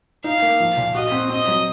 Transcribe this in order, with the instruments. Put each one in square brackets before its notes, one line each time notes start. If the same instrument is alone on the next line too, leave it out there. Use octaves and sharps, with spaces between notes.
[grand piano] D#4 [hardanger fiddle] F5
[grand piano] A#3
F3
A#2
[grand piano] F#4 [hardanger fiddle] D#5
[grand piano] C4
[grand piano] C4 [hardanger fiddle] D#5
[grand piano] F#3